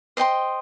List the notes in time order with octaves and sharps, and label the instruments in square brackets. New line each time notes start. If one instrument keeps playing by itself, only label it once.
[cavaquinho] C5 D#5 G5 C6